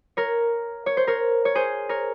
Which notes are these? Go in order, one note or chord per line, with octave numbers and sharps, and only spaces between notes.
A#4 C#5
C#5
C5
A#4 C#5
C#5
G#4 C5
A#4 C#5